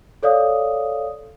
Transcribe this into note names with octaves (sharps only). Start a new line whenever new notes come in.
A4 C#5 D5 F5 D#6